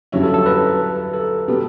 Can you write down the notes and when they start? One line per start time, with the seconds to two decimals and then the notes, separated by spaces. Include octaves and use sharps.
0.12 G2 D3 F#3 C#4 E4
0.23 A4
0.34 A4
0.46 B4
1.14 A4
1.48 B2 G3 B3